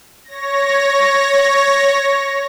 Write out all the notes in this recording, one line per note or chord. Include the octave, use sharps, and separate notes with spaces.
C#5 A#6